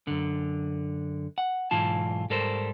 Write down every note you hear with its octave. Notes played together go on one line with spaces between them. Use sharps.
F#2 D3
F#5
B1 G#2 E3 F4 A5
G#2 G3 A4 A#4 C5